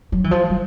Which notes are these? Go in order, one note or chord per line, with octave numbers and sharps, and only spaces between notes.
F#3
E3
F3
G3